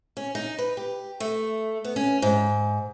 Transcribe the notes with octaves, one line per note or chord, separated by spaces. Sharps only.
C#4
D#4
B4
G4
A3
B3
C#4
G#2